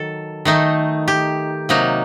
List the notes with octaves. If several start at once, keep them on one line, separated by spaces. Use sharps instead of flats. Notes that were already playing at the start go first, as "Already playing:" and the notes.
Already playing: D#3 F#3 A4
D#3 A3 D#4
G4
C3 F#3 A#3 D#4